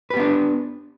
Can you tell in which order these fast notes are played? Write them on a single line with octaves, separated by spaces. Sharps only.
B4 G4 B3 D4